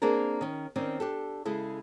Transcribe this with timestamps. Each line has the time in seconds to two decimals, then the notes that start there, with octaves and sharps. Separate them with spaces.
0.02 A#3 C4 D4 G#4 A#4
0.41 D#3 C#4
0.76 D#3 C4 C#4 D5
1.00 D4 G4 A4
1.45 C#3 G#3 E4 A4